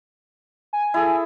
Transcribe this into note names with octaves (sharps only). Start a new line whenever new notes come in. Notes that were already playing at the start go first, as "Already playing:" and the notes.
G#5
E4 G#4 A4